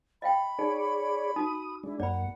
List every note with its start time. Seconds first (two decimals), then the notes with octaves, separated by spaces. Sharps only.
0.22 D#5 F5 G5 B5
0.59 D#4 G#4 C#5 D5
1.36 D#4 F#4 D#6
1.84 G#3 D4 E4
2.00 F#2 A#3 D5 F#5 B5